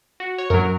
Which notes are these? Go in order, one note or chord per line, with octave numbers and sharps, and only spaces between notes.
F#4
C#5
F#2 F#3 A#4